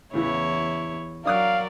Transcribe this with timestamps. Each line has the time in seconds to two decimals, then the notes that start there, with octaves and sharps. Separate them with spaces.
0.14 E2 A2 C#3 E3 E4 C#5
1.26 F#3 D4 A#4 D5 F5 D#6 F#6